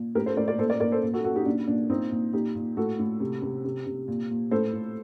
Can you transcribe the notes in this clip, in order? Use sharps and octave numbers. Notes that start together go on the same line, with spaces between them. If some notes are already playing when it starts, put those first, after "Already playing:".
Already playing: A#2
A2 G4 A#4
A4 C5
A2 A#4 D5
A#4 D5
A#2 A4 C5
A#4 D5
A#2 A#4 D5
A4 C5
A#2
F#4 A4
A#2 F#4 A4
D#4 G4
A#2 D4
A#2 D4
A#2 C4 D#4
A#2
A#2 D#4 G4
A#2
A2 F#4 A4
A2
C3
C3
C3
C3
A#2
A#2
A2 A4 C5
A2